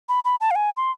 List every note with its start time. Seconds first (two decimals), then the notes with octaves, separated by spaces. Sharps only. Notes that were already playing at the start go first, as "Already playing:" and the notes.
0.09 B5
0.25 B5
0.41 A5
0.51 F5
0.55 G#5
0.77 C6